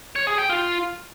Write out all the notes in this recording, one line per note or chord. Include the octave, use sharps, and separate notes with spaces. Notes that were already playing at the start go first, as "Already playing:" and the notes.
C#5
G#4
G5
F4